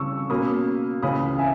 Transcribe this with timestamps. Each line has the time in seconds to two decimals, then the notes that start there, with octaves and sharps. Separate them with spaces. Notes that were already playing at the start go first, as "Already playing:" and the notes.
Already playing: C#3 E3 G3 C#6 E6
0.30 B2 A#3 C#4 B5 D#6
1.02 C#2 C#3 E3 B5 D#6
1.39 E5 G#5